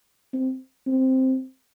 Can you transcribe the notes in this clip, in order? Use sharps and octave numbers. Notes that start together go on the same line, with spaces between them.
C4
C4